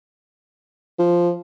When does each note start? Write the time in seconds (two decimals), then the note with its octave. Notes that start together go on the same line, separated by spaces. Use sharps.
0.99 F3